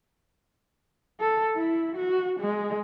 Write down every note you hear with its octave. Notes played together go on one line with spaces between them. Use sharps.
A4
E4
F#4
G#3